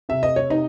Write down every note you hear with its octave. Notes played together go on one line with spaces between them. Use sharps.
C3 E5
D#5
C#5
C3 D#4 D#5